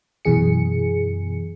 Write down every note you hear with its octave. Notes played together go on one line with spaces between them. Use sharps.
F#2 B2 E3 G#4 C#7